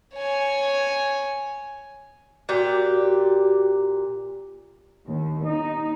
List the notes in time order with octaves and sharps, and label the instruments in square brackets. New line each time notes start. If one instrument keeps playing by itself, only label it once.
[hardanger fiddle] C#5 G#5
[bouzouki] A#2 G4 [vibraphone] F#4
[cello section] D#2
D#4